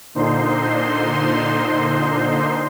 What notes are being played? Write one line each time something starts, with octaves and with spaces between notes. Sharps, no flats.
A#2 D3 D#4 C5 C6